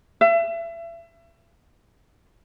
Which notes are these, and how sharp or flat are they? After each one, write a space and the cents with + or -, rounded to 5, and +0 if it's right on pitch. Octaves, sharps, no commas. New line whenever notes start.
E5 +30